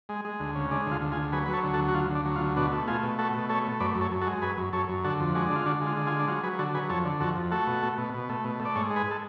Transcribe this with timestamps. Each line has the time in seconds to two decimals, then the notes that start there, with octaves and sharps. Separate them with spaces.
0.09 G#3
0.25 G#3
0.40 D2
0.55 C#3
0.71 G#3 D4
0.86 D2 F4
1.02 D2
1.12 F4 G#4
1.17 D2
1.33 F#3 G#4 B4
1.46 F#3 B4
1.53 A4 C#5
1.64 D2
1.74 F#4 A4
1.79 F#3
1.88 F#4
1.94 D2 F4
2.10 D2
2.15 D4
2.25 F#3
2.36 F4
2.40 D2
2.56 B2 D4 F#4
2.72 A3
2.87 A3 F4 G#4
3.03 B2
3.18 A3 F#4 A4
3.34 B2
3.49 A3 A4 C#5
3.65 A3
3.80 F#2 B4 D5
3.95 F#2
4.01 A4 C#5
4.11 F#2
4.21 F#4 A4
4.27 G#3
4.42 F#2 G#4 B4
4.58 F#2
4.73 F#2 A4 C#5
4.89 F#2
5.04 D3 F#4 A4
5.20 F2
5.35 G#3 D4 F#4
5.46 D3 D4
5.56 F4
5.66 D3 D4 F#4
5.81 G#3
5.87 F4
5.97 D3
6.07 F4 G#4
6.12 G#3
6.20 D4
6.28 F#3 F4
6.43 F#3 G#4 B4
6.59 D3 F#4 A4
6.74 F#3 G#4 B4
6.89 F2 A4 C#5
7.05 D3
7.20 F2 F#4 A4
7.36 F2
7.51 A3 F#4 A4
7.67 B2
7.82 A3
7.98 B2
8.13 B2
8.29 A3
8.44 B2
8.60 A3
8.65 D5
8.75 G#2 A4 C#5
8.90 G#3
8.96 G#4 B4
9.11 A4